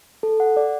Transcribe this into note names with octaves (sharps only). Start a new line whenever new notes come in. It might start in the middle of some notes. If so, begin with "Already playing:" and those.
A4
F#5
D5